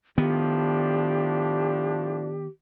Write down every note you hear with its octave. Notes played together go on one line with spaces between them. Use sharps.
A2 D#3 F3 B3 D4 G4